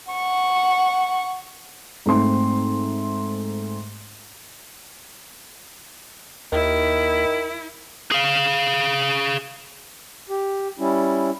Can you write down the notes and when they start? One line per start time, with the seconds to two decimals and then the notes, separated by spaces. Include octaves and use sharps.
0.11 F#5 C#6
2.06 G#2 A3 C4 C6
6.52 D#2 D#3 E4
8.11 G#4 F5
10.30 G4
10.79 G3 C#4 E4